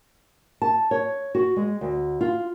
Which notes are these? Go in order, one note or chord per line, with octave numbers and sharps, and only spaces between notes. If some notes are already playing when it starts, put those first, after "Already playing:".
A5
C#5
F#4
G#3
D2
F4